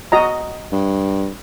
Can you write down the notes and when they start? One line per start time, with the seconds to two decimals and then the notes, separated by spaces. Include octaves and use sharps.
0.12 F#4 D#5 A#5
0.72 G2